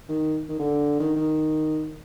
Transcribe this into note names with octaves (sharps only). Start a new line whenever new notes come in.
D#3
D#3
D3
D#3
D#3